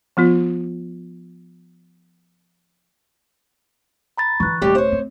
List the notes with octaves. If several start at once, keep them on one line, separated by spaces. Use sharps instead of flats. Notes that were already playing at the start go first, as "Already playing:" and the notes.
F3 B3 F4
A#5 B5 A6
D3 E3 C#6 F#6
D#1 D#2 G3 A3 G4
C5 C#5
C4